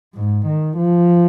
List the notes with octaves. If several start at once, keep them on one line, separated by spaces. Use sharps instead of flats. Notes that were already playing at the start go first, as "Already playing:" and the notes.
G#2
D#3
F3